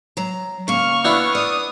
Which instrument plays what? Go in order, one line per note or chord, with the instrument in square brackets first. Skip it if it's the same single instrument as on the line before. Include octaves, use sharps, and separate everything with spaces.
[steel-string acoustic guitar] F#3 A#5
[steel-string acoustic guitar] C#3 A#3 [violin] C#6 F6
[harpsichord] B3 D4 E4
[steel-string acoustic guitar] D5 [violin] D#6